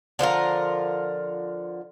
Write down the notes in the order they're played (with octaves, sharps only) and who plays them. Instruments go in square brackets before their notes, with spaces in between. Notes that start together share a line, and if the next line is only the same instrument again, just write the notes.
[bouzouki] D3 F3 F4 A#4